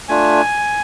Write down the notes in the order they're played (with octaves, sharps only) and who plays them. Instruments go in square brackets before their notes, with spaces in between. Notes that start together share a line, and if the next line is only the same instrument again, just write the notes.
[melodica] A3 D4 F4 G#5